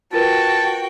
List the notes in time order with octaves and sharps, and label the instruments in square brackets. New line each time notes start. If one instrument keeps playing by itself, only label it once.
[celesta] F4 A#4 B4 [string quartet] F#4 G5 [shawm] A5